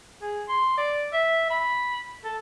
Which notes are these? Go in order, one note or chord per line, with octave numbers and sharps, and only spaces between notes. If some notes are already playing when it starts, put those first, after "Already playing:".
G#4
C6
D5
E5
B5
A4